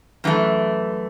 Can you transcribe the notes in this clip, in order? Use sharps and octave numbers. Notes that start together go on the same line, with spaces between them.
F#2 E3 A3